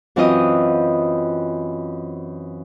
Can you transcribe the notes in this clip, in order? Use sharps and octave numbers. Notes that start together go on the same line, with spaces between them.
F#2 E3 C4 F4 D#5 D#6